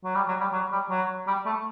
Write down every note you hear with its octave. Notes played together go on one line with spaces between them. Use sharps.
F#3
G3
F#3
G3
F#3
G3
F#3
G3
A3